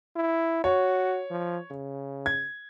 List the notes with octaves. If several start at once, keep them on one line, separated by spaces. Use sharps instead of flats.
E4
F#4 C#5
F3
C#3
G#6